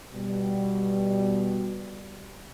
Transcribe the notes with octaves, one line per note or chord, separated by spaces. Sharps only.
B2 G3